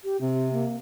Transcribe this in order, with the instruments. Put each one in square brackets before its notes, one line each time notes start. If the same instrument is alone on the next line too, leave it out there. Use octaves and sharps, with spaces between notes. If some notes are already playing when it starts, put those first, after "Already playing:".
[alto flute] G4
[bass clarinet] C3 [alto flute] C4
[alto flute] A#3